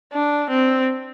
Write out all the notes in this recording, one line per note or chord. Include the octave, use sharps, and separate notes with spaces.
D4
C4